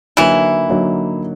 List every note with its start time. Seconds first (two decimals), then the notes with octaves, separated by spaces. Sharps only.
0.17 D3 E3 F#3 A#3 D#4 E4 F#4
0.70 D3 F#3 A#3 D#4 F#4